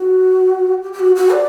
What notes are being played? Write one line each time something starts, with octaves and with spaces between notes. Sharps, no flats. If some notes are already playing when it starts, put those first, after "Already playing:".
Already playing: F#4
G4
G4
F#4
F#4
D5